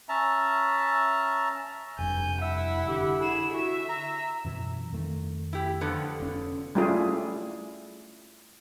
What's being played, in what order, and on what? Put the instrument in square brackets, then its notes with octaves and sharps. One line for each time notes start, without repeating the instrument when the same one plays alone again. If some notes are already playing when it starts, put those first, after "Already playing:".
[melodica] C#4 E5 A5 A#5
[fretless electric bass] F1 G2 [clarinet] G#5 [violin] G6
[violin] E4 F#5 [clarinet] E5
[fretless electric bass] D3 [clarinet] G4
[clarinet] E4 [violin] G#4 E7
[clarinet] F#4 [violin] E5
[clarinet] A#5
[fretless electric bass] F#2 B2 E3
F2 D#3 A3
[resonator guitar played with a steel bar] E4 G4
D3 F3 B3
[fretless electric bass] F1 C#4
[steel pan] G3 A3 C#4 E4 F4 G#4